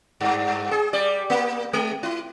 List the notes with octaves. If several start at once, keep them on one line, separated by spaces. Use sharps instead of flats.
G2
G#4
G3 D5
A#3
G#3
E4